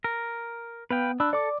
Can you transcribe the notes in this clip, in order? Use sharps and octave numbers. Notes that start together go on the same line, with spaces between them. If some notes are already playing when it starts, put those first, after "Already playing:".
A#4
B3 B4 F5 G5
D4 B5 E6 F#6
A4 D5 D6